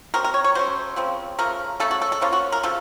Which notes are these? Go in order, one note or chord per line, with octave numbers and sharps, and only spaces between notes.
D#3 F#3 C4 A#4
A#4
C#5
C#5
F#3 A3 C#4 C5
C#3 F3 C4
C#3 F3 A3 A#4
C#3 A3 C#4 A4
F#4
A4
A4
F3 A#3 C#4 F4
F#4
A#4
C#3 F3 A4